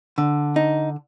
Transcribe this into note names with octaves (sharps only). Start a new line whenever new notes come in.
D3
D#4